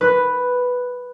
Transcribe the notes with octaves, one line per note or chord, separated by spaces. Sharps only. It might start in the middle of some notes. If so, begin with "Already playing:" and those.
B4